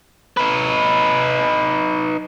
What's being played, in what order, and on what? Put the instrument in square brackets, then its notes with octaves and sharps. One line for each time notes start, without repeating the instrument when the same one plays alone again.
[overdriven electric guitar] D#4 B4